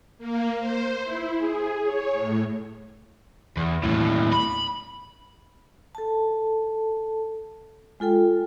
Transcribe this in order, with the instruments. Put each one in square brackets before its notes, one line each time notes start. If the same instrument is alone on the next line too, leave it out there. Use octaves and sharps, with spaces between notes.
[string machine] A#3
C5
E4
G#4
C#5
A2
[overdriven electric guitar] E2
D#2 A2
B5
[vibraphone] A4 A5
G#3 F4 A4 G5